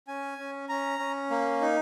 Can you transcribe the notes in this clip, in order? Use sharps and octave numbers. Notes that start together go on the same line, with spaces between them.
C#4 G#5
C#4
C#4 A#5
C#4
A#3
D#4